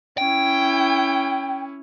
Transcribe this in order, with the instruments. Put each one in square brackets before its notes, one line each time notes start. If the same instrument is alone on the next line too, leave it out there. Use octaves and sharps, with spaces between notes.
[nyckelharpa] C#4 E4 [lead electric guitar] G5